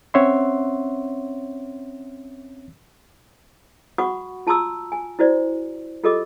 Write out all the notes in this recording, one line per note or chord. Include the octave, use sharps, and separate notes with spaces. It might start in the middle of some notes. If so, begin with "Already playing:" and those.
C4 C#4 C#5 E5 F#5 C6
F#4 F#5 B5 C#6 D#6
F4 A5 A#5 C6 D#6 E6
G#5
E4 F#4 C5 D5
F4 G4 A4 A#4 D#5 D6